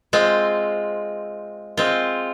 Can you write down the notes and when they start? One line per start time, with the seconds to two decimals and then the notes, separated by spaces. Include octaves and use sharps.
0.13 G#3 C4 F4
1.77 G#3 C4 F4